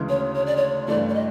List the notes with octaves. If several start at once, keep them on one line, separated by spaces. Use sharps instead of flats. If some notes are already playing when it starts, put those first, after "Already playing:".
Already playing: D2 C#3 E3 G#3
C#5
C#5
D5
C#5
G2 E3 A3 D5
D5
D#5